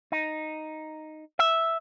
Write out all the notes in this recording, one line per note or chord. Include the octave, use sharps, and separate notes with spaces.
D#4
E5